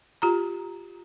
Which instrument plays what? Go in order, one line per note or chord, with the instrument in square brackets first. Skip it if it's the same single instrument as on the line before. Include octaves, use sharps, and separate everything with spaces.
[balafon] F4 G4 A#5